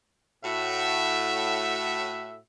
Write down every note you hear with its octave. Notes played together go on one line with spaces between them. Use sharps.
A2 F#4 E5